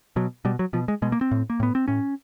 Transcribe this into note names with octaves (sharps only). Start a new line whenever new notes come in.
B2 F#3
B2 G3
F#3
B2 F3
G#3
B2 G#3
A#3
C4
A2
A#3
A2 B3
C4
A2 C#4